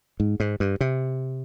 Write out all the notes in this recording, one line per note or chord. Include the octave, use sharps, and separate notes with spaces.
G#2
G#2
G2
C3